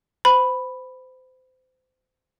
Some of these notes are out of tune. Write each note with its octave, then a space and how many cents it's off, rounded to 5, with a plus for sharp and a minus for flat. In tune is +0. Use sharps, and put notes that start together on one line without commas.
C5 -30 B5 +0